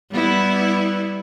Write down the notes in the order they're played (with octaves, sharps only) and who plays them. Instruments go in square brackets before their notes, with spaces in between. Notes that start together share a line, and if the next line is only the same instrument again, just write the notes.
[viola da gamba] G3 B3 E4